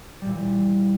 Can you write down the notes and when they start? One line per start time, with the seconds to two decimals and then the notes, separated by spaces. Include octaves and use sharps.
0.21 G3
0.25 A#2
0.28 E3